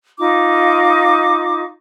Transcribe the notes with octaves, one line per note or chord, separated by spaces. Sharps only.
D#4 F4 D6